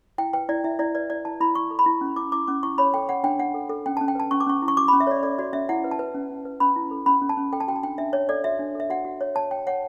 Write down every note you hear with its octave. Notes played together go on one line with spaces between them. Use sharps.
E4 G5
B4 G5
E4 D5
E4 E5
E4 D5
B4 D5
E4 D5
E4 A5
E4 B5
E4 C#6
A4
B5
E4
C#4
E4 D6
E4 D6
C#4 D6
E4 C#6
C#5 B5
A4 G5
C#5 F#5
D4 G5
D4 F#5
A4
A4
C#4 G5
A5
C#4
G5
B4 A5
C#4 C#6
D6
C#4 C#6
E4
C#6
F#4 D6
B5
C#4
E5
A4 C#5 D5
A4 D5
F#4 D5
C#4 E5
E4 F#5
B4
A5
B4
C#4
C#4
B4
C#4 B5
E4
A4
C#4 B5
C#4
A5
C#4
A4 G5
A5
F#4 G5
A5
D4 G5
D4 E5
C#5
A4 D5
F#4 E5
D4
A4 E5
F#4 F#5
F#4
C#5
C#5 A5
C#5 G5
C#5 F#5